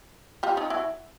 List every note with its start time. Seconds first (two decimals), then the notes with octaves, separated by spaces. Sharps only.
0.43 F4 G4
0.57 D#4 F4
0.70 E4 F#4